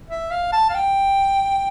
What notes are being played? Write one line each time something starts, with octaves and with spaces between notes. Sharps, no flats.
E5
F5
A5
F5
G5